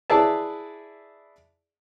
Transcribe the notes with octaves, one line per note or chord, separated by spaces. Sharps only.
E4 G#4 B4 D5 E5 A5